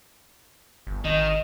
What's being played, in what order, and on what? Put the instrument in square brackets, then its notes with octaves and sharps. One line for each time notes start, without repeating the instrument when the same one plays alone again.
[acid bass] G1
[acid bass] G#1 [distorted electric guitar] D#3 [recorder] D#5